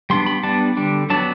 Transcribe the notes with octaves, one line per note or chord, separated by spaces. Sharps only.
G3 B3 D4 C6
B5
G3 B3 D4 A5
D3 G3 D4
F#3 B3 D4 A5